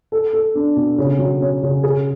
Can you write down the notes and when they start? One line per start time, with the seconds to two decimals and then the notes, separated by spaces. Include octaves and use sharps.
0.12 A4
0.33 A4
0.55 D4
0.76 B2
0.98 C#3
1.19 F#3
1.41 C#4
1.63 C#3
1.83 G#4